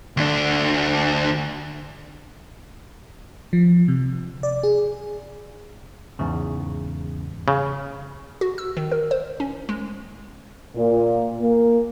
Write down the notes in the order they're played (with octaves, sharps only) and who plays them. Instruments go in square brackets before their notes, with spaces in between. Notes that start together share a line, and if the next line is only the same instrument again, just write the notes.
[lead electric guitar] D2 D4
[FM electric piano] F3
C3
D5
G#4
[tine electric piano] E2 G#2 C#3
[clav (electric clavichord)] C#3
[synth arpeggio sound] F#4
E6
D#3
A#4
C5
C#4
G#3
[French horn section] A#2
A#3